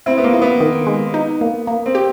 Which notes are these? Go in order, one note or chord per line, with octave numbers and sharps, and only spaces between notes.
C4 E4
B3
A#3
E4
B3
D#3
G#3
D#4
A#3
A#3
C4
G4